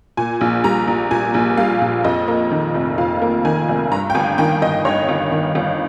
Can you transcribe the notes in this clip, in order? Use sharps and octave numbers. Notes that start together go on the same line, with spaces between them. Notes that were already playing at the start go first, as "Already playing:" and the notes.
A#2 G#5
A#1
G3 A#5
A#1
A#2 G#5
A#1
G3 F5
A#1
F2 D#5
A#3
D#3
F1
F2 F5
A#3
D#3 G#5
F1
G2 A#5
G5
G1 G#5
D#3 G5
G1 D#5
G2 C#5
G1
D#3
G1